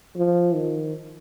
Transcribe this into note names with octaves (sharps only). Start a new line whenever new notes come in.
F3
D#3